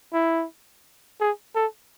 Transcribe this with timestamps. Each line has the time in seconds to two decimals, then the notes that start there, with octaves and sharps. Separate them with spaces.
0.13 E4
1.20 G#4
1.55 A4